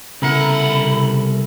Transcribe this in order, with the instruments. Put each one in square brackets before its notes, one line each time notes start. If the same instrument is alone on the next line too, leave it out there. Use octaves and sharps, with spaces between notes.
[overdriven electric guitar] C2 F#5 [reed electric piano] C#3 B3 [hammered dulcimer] E4 A4 A#4 [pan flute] B5